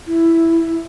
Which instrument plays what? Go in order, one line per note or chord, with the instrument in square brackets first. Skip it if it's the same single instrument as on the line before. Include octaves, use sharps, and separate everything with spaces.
[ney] E4